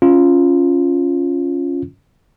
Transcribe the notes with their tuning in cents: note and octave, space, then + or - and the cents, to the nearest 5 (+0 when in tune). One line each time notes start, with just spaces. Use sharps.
C#4 +0 F4 +0